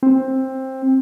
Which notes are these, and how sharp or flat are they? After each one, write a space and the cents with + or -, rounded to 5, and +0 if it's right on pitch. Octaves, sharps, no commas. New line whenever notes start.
C4 +15